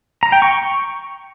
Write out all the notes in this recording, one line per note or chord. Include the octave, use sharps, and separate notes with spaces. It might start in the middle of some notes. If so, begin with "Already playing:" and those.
A#5
G5
C#6